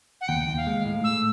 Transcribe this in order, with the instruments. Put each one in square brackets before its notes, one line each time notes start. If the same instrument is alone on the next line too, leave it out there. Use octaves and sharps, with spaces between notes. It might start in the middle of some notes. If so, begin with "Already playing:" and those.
[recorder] F#5
[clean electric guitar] D#2 [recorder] G5
[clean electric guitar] D#2
[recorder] F5
[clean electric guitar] G#3
A2
[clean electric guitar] A2 [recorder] E6